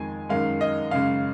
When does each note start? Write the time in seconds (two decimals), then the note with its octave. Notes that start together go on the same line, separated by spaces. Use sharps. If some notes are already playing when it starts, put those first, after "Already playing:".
Already playing: F2 D#3 G#3 G#5
0.29 F#2 D#3 G#3 F5
0.61 D#5
0.91 F#2 C#3 G#3 F5